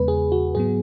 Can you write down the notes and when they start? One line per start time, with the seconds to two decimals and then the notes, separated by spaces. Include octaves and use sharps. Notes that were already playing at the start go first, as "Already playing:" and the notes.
Already playing: E2 C#3 G#3 B3 B4
0.08 G#4
0.32 F#4
0.55 G#2 F#3 B3 G#4